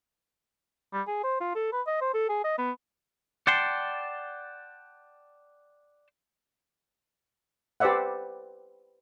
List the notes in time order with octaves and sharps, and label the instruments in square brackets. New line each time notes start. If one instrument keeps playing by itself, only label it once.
[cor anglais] G3
G#4
C5
F4
A4
B4
D#5
C5
A4
G#4
D#5
B3
[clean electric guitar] D5 F#5 G5 A5 C6
[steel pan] G4 B4 C5 D5 E5 F#5